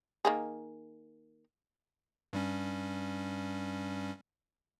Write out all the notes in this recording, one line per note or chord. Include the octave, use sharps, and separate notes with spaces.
D#3 A#3 G#4
G2 G3 C#4